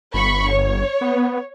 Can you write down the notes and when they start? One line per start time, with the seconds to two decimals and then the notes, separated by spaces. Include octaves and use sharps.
0.14 G1 B5 C#6
0.50 C#5
1.01 B3